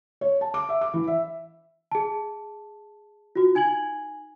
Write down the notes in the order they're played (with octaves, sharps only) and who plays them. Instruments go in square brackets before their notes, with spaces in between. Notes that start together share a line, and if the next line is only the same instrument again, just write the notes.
[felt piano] C#5
A5
D6
E5
D6
E3
E5
[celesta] G#4 A5
F4 F#4
D#4 G#5 G#6 F#7